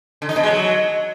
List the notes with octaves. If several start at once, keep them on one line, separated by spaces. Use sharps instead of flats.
D3
D#4
B2
G#3
F#3